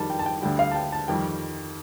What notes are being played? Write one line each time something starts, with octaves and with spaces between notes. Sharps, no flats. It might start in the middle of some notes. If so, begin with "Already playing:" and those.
Already playing: F2 D#3 G3 A5
G5
A5
G5
D2 D3 G3 G5
F5
A5
G5
A5
F2 D#3 G3 G5